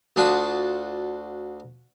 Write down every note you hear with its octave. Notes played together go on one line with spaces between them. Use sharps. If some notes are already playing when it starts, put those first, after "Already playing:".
D2 D4 F4 F#4 A5 D#6